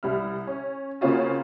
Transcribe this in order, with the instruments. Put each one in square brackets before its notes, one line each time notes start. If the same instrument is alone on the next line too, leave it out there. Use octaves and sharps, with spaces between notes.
[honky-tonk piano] C2 G3 E4 F6
C#4
C#3 A#3 C4 C#4 F4 F#4